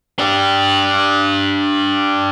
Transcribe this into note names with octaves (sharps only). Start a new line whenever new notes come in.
D4 G4